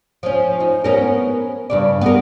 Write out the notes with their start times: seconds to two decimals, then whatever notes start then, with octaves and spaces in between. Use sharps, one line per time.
0.23 F3 C#4
0.60 D#4
0.84 B3 C#4 A#4
1.70 G2 C#3 D5
2.01 B3 A#4